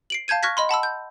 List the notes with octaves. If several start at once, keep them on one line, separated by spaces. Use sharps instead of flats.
C7 D7 F#7
F5 A5 G6 G#6 D#7
C#6 F6 F#6 G#6 A#6 B6
D#5 B5 C6
F#5 A5 B5 E6
G6